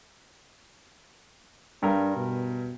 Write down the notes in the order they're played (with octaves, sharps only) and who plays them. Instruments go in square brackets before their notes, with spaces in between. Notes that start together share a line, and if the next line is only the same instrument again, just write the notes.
[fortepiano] G2 A#4 [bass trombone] D4
[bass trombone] B2